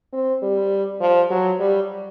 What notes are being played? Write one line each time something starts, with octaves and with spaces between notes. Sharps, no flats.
C4
G3
F3
F#3
G3